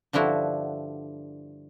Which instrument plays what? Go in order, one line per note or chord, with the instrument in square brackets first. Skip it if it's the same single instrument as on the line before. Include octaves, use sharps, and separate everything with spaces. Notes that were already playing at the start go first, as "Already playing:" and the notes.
[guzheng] G2 D3 F3 E4 F#4